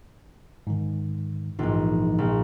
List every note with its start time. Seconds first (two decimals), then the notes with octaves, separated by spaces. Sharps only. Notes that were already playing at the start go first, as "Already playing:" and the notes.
0.67 G#2 D#3
1.59 A#1 G#2 E3 D#4
2.18 A#1